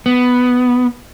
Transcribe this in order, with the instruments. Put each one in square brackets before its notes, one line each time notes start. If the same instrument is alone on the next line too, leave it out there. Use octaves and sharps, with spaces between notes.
[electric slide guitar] B3